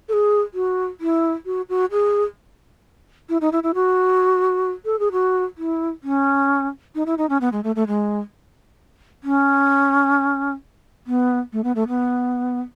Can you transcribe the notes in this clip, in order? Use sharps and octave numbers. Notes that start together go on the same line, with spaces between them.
A4
G#4
F#4
E4
F#4
F#4
G#4
E4
D#4
E4
E4
F#4
A4
G#4
F#4
E4
C#4
D#4
E4
D#4
C#4
B3
G#3
A3
A3
G#3
C#4
B3
A3
B3
A3
B3